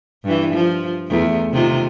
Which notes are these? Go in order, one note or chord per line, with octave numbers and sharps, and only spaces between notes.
G2 E3
F3
E2 A3
C3 D#3 F4